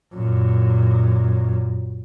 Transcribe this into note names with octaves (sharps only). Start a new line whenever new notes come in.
F#2 A#2